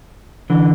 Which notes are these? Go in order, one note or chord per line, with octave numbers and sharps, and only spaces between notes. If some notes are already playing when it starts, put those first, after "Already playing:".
D3 E3